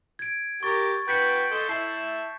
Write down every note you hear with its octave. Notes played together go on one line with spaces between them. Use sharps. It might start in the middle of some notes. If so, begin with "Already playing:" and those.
G#6 D7
G4 A#4 C#6 A6
F#4 B4 G5 G6 B6 C#7
A4 D#5 C6
E4 E5 A5 C7